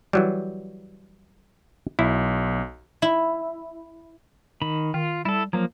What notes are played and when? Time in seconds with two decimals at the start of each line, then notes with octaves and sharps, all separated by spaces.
0.13 E3 F#3 G3
1.99 B1 E4
3.02 E4
4.62 D#3 B5
4.94 D#3 F4
5.25 G3 E4 A4
5.53 F3 F#3 A#3